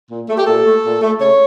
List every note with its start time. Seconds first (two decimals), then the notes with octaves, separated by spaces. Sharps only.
0.09 A#2
0.28 A3
0.37 G4
0.46 A#2 A4
0.64 A3
0.83 A#2
1.01 A3
1.19 C#3 C#5